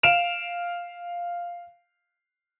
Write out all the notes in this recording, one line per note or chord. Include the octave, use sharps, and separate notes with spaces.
F5 D7 E7 F7